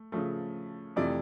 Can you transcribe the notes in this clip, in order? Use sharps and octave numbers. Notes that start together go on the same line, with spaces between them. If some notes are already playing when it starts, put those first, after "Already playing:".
Already playing: A3
C#3 F3 A3
F2 C3 E3 A3 D5